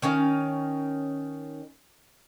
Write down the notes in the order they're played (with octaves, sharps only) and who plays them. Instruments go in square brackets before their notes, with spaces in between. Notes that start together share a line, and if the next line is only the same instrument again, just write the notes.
[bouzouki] D#3 C#4 D#4 F5